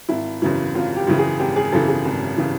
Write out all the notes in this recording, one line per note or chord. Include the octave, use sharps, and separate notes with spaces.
G#1 E4
F#2 C#3 E3
G#1 F4
G4
F#2 C#3 E3
G#4
G#1 G4
G#4
F#2 C#3 E3 A4
G#4
G#1
C#3 E3